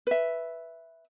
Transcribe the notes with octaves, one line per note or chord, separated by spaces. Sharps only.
B4 E5